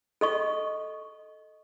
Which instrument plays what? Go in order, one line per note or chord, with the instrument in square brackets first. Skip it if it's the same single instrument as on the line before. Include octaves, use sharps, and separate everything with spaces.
[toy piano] A4 D#5 C#6